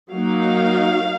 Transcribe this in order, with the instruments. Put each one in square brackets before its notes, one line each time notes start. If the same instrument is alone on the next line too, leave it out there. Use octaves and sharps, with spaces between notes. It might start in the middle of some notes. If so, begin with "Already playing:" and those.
[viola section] F#3 A#3 D#4 F5